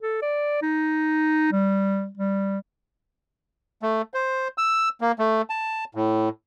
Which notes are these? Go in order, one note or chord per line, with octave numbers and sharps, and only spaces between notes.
A4
D5
D#4
G3
G3
A3
C5
E6
A#3
A3
A5
A2